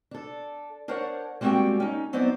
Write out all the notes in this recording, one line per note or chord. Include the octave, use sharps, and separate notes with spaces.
D4 A4
D4 A#4 C5 C#5 F#5
G3 G#3 A#3 C4 F#4 G5
C#4 D#4
F#3 B3 C4 D#4 C5 D5